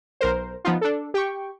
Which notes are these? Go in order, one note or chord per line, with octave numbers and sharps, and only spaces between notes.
B1 A#4 C5
F3 B3 D#4 F4
D4 A4
G4 G5 C#6